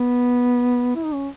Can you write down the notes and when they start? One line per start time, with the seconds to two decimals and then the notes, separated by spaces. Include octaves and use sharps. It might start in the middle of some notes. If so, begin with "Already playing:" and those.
Already playing: B3
0.96 E4
1.05 D#4
1.14 C#4